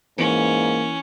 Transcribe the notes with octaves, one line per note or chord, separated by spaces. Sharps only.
G#2 E3 A#3 C#4